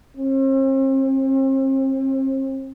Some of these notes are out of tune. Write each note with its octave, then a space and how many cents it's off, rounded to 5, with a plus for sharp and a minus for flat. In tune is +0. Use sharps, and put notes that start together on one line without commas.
C4 +40